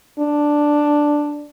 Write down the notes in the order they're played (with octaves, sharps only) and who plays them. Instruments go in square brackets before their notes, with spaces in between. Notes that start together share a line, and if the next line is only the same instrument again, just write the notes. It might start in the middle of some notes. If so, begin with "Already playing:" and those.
[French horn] D4